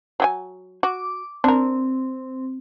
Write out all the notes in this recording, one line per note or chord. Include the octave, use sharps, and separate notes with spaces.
F#3 G4 G#5
F#4 D6
C4 D4 A#4